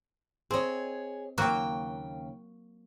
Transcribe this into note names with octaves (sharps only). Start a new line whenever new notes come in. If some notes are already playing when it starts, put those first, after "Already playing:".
C4 G#4 C#5 D#5
D#2 C#3 F#3 A#3 F#4 G5